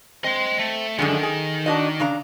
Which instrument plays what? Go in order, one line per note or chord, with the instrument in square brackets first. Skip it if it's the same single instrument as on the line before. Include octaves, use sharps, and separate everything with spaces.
[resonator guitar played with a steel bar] C4 [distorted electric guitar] D#5 C6
[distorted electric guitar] A3
[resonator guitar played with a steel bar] F#2 D3 G#3 [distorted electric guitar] D#3
[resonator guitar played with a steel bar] G#4
D4 F#4 D#5
C#3 D4 A#5